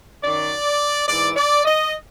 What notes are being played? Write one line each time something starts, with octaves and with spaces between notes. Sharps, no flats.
F#2 D#3 F#3 D5
G#2 E3 D5
D5
D#5